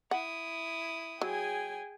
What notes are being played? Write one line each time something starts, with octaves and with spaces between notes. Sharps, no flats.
E4 F#5 D#6
F#3 G#4 G5 G#5